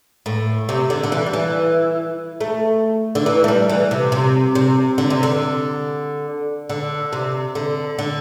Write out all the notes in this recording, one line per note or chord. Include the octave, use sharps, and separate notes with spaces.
A2
C3
D3
D3
E3
G3
E3
A3
D3
E3
A3
G3
E3
C3
C3
C3
D3
C3
D3
D3
C3
D3
D3